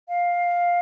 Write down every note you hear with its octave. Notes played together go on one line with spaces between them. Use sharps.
F5